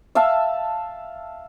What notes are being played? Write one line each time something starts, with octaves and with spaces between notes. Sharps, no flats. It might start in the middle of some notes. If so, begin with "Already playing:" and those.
E5 F5 A5 E6